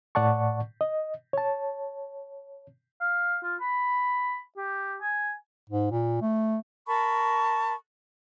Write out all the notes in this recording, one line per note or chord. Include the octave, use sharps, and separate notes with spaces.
A2 D5 F#5 A5 C#6
D#5
C#5 A5
F5
F4
B5
G4
G#5
G#2
A#2
A3
A#4 A5 B5 C#6